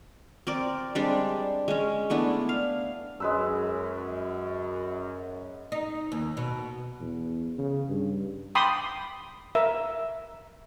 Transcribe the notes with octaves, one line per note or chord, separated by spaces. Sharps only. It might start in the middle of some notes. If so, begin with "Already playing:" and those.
C4 A#4 D5
G3 G#3 C4 D4
G#3 C#4
A3 B3 D4 E4
F5
F#2 G#3 B4 E6
D#4
D#2
B2
E2
C#3
G2
G5 B5 C6 D6 D#6
A#4 E5